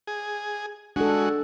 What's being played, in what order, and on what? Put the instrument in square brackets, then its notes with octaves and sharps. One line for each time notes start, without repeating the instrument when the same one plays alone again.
[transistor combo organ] G#4
[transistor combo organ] G#3 F#4 [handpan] D4 A4